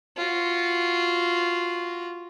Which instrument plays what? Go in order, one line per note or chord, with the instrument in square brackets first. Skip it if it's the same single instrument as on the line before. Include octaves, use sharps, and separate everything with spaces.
[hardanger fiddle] F4 F#4